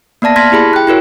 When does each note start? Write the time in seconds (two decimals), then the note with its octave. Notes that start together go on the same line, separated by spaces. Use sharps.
0.22 A#3 B3 D5 A5 A#6
0.36 A5 C6 F6 G#6 A#6 B6
0.52 E4 G4 G#4 B5
0.73 G5 F#6
0.87 E4 F#4 A#4 C#5